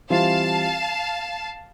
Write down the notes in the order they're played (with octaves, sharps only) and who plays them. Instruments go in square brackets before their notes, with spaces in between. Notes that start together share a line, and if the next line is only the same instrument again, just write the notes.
[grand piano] E3 G3 C4 F4 [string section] F5 A5